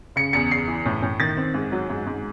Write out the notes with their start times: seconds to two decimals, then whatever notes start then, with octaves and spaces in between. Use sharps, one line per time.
0.16 C#3 C#7
0.33 E2 C#7
0.51 E2 C7
0.68 E3
0.85 A2
1.02 A2
1.20 D#3 A6
1.37 C4
1.54 G#2
1.72 F#3
1.90 G#2
2.06 G#2